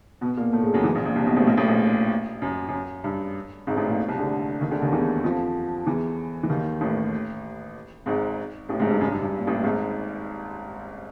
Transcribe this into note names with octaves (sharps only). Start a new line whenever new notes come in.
B2 B3
A#2 A#3
A2 A3
G#2 G#3
F#2 F#3
E2 E3
A#1 A#2
A#1 A#2
C2 C3
B1 B2
A1 A2
A#1 A#2
A1 A2
A#1 A#2
F#2
F#2
G2
G#1 G#2
A1 A2
A#1 A#2
C2 C3
D2 D3
D#2 D#3
D2 D3
D#2 D#3
E2 E3
F2 F3
E2 E3
E3
D#2 D#3
A1 A2
G#1 G#2
A1 A2
G#1 G#2
G2
F#2
G2
G2
A#2
A1 A2
G#1 G#2